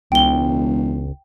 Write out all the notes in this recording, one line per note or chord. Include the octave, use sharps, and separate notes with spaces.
E1 C#2 G5 G7